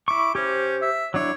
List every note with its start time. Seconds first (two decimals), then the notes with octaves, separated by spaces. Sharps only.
0.08 E4 C#6 D6
0.35 C#4 G4 C5
0.82 E5
1.14 F#3 D4 E4 C#5